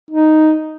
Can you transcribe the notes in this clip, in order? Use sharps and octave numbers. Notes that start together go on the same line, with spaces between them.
D#4